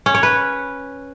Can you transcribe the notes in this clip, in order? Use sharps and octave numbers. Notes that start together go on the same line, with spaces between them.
C#4
C#5
B4